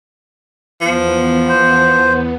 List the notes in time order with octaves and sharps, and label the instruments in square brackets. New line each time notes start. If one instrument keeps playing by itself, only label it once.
[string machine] E2 B3 [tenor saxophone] F3
[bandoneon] C5